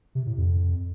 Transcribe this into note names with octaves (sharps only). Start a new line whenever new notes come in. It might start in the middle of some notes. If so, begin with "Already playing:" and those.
C3
A2
F2